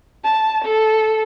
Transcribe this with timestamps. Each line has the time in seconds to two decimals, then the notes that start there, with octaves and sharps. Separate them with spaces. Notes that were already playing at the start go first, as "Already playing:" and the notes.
0.24 A5
0.64 A4